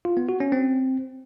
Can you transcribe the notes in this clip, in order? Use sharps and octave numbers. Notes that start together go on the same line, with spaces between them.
F4
B3
F#4
C#4
C4